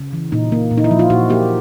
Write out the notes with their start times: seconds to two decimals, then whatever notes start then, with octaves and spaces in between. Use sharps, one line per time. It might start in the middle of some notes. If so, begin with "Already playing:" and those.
Already playing: C#3
0.13 E3
0.32 A#2 D#4
0.52 A#3
0.71 A#2
0.78 D#4
0.84 E4
0.91 F3
0.99 F4
1.10 A#2 F#4
1.30 A#3 G4